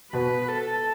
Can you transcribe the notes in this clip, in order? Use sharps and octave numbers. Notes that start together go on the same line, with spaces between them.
B2 B4
A4